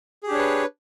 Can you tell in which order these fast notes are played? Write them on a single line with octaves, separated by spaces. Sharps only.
G#4 G4 D4 C#5 B4